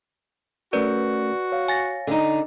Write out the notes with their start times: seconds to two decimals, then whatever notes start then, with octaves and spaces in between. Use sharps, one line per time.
0.73 A3 C#4 F#4 A#4 B4 D5
1.52 C#5 F5
1.68 G#5 A6 A#6
2.07 D3 D#4